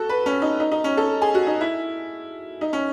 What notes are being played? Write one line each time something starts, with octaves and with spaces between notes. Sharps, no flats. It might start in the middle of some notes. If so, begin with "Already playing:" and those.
Already playing: F#4 A4
B4
C#4
D#4
D#4
D#4
C#4
A4
G#4
F#4
D#4
E4
D#4
C#4